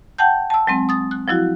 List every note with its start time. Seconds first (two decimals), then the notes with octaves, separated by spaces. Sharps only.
0.18 F#5 G5 A5 G6
0.50 A5 E6
0.67 F#3 G#3 C4
0.89 D#6 A6
1.11 F#6
1.28 F3 F#3 E4 F#4